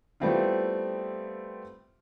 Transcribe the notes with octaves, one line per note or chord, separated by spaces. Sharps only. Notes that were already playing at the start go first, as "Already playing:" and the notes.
G3 A3 B3 C4 E4 F4